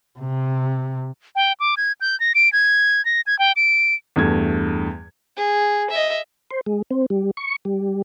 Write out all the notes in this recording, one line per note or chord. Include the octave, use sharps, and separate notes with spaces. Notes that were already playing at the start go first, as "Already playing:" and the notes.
C3
G5
D6
G#6
G6
A#6
D7
G#6
A#6
G#6
G5
D7
E2 G2 A3 G#6
G#4
D#5 E5
C5
G#3
C4
G3
C#6
G3